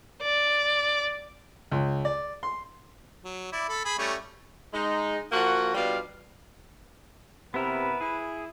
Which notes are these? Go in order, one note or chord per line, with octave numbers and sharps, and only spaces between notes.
D5
C#2
D5
C6
F#3
E4 D5
A4 B5
G#4 B5
G3 A3 C#4
G#3 D#4
F3 A#3 F#4
B2 G3 D4 F4 F5
C3 B3 E4 A#4 B4
E4 G#4